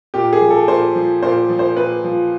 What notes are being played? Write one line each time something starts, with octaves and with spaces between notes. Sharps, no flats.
A#2 G4
G#4
F3
A4
A#2 C5
F3
A#2 C5
F3
C5
A#2 B4
F3